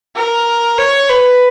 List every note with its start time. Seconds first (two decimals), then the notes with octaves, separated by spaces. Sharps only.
0.16 A#4
0.78 C#5
1.09 B4